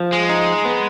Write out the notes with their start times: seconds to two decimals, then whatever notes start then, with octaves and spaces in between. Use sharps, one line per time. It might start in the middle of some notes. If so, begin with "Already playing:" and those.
Already playing: F3
0.12 G#3
0.29 D#4
0.65 B3